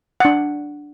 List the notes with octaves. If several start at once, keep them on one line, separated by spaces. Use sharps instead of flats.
D4 F#5